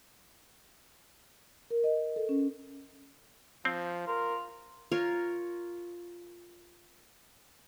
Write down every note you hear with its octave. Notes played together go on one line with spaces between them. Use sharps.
A#4
D#5
A4
C#4
F3 C4
F4 A#4
F4 A#4 C#5